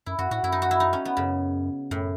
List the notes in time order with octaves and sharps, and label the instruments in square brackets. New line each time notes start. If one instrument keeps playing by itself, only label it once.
[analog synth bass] F#2 [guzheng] E4
[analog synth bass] F#2 [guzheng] F#4
[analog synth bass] A2 [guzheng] F#4
[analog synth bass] F#2 [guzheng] E4
[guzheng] D#4
F#4
E4
D#4
C#4
B3
[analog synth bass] F#2 [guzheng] C#3
[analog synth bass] F#2 [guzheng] A2